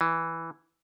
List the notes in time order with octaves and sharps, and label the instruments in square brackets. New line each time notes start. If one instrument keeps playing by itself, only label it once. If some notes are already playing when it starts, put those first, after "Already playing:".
[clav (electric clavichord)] E3